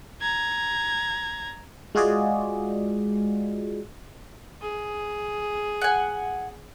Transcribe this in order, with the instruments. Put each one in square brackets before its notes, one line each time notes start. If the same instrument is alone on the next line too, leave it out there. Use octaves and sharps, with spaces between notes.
[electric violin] A#5 G#6
[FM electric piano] G#3 F4 F#4 G#4 D5 D#5
[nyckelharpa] G#4
[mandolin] F#5 G#5